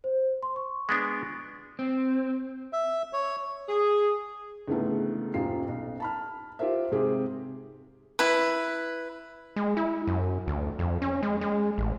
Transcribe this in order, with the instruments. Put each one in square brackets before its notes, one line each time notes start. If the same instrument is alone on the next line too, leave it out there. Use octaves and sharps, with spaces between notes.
[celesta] C5
C6
C#6
[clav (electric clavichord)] G#3 B3 D4
[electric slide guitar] C4
[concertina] E5
C#5
[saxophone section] G#4
[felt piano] C#2 G#2 D3 E3 A3 B3
D#1 F#2 F4 C7
B1
A5 B5 F6
F4 G4 A#4 C5 E5
G#2 C3 G#3 C4 G4 G#4
[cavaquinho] E4 B4
[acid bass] G#3
E4
F#2
D2
F2
C#4
G#3
G#3
A1